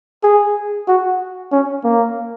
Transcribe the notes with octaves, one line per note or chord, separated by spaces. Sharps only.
G#4
F#4
C#4
A#3